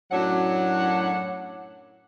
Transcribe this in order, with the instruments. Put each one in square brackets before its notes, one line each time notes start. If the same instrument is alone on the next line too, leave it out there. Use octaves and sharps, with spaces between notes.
[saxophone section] F#2 A2 F#3 D4 C#5 F#5